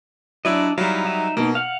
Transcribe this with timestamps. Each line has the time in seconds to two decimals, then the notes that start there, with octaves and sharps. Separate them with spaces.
0.45 F#3 D4 E4 D5 D#5 E6
0.78 F#3 G3 D#4 E4 F5
1.05 D#4 E5
1.37 B2 A#3 D#4
1.55 F5 F#5 F6